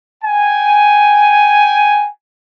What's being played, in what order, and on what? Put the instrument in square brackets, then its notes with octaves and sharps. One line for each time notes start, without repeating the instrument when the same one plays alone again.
[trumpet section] G5 G#5